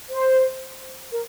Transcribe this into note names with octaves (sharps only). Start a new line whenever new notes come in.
C5
A#4